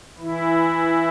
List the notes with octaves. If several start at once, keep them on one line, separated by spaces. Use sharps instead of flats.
E3 E4